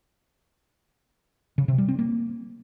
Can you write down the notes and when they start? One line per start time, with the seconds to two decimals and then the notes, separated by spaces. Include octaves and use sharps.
1.58 C#3
1.68 C3
1.78 G3
1.88 C4
1.99 A#3